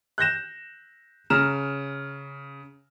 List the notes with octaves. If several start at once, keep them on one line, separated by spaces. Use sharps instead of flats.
F#6 G6 A#6 E7
C#3 A#5 F6 E7